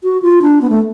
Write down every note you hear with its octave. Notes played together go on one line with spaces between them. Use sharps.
F#4
F4
D4
B3
A3